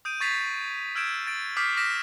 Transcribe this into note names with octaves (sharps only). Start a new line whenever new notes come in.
D#6 G6 D7 D#7
C#6 G#6 A6 B6 C7 F7
E6 F6 G6 G#6 D7 E7
G6 A6 D7
D6 D#6 F6 G6 B6 C7
D6 F6 A#6 B6 D7 E7